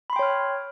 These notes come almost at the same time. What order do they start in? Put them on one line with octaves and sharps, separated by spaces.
B5 C6 G5 C#5 F6